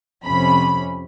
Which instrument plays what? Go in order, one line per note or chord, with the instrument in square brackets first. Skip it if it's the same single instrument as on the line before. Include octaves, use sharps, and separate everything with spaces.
[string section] F2 C3 C#4 B5